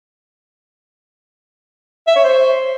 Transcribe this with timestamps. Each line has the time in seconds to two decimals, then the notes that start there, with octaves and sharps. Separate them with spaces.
2.07 E5
2.16 C#5
2.24 C5